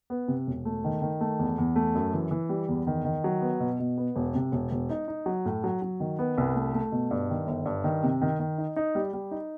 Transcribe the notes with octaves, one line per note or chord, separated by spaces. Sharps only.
B3
C3
E1
A3
D#3
D#3
A3
E2
E2
A3
F#2
E3
E3
G3
E2
D#3
D#3
F#3
B3
B2
B2
B3
E1
C3
E1
E1
D#4
D#4
F#3
A2
F#3
F#3
D#3
B3
C2
A3
A3
B2
G2
D#3
G1
G2
D#3
C3
D#3
D#3
D#4
D#4
G3
G3
D#4